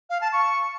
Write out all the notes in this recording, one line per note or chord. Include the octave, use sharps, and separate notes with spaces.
F5
A5
C#6